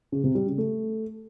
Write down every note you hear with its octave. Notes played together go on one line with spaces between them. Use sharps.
C#3
C3
G3
C#3
A3